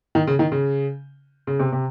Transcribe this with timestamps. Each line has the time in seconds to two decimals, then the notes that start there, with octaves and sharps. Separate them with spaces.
0.15 D#3
0.27 C#3
0.39 D#3
0.52 C#3
1.47 C#3
1.59 C3
1.72 C3